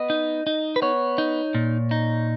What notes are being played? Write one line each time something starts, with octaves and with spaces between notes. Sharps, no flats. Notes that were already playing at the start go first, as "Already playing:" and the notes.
Already playing: B3 D#5
D#4
D#4
B4
B3 C#5
D#4
A#2
D#4